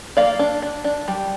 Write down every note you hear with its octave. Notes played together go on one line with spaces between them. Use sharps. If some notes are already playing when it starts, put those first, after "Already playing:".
A#3 D5 F5
D4
D4
D4
G3